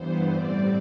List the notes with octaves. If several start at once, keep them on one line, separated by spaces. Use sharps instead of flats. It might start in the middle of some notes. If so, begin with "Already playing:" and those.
Already playing: G2 E3 B3 C5
A2 G3 C4 D5